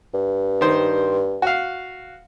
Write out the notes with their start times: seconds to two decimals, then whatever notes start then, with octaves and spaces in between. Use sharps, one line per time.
0.14 G2
0.61 D#3 C5
1.42 F#4 F5